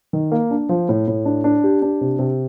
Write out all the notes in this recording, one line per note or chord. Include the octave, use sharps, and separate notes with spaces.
D#3
A#3
D4
F3
A2
A2
D4
D4
G4
D4
C3
C3